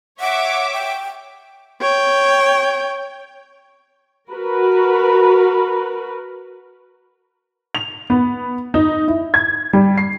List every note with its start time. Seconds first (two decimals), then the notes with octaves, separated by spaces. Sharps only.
0.20 C#5 E5 F#5 D6
0.73 G5
1.81 C#5 G5
4.31 F#4 A#4 B4
7.75 F7
8.10 B3
8.74 D#4
9.08 E4
9.34 G#6
9.73 G3
9.98 C7